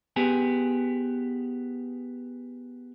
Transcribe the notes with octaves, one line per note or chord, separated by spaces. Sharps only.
B3 G4 G#4